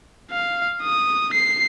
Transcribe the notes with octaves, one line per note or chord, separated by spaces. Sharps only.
F5
D#6
C7